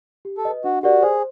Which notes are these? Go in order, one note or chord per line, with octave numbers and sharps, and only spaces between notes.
G4
A4
B4 D#5
D4 F#4
F#4 G4 A#4 D5
G#4 C5